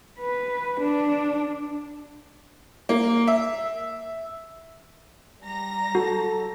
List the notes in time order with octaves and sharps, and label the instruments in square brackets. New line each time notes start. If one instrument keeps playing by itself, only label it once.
[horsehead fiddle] B4
D4
[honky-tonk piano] A#3
E5
[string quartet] G3 A#5 A#6
[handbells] F#4 [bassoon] A4